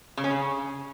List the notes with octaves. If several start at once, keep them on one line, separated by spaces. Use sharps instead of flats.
C#3
C#4
C#3